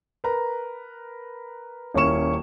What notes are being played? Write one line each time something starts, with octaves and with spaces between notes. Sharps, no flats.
A#4 B4 A#5
D#1 A#3 C#4 E4 C#6 E7